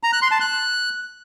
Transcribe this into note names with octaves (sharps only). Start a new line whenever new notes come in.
A#5
F#6
C6
A5
F#6